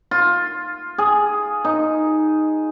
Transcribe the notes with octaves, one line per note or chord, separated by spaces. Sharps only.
F4
G#4
D#4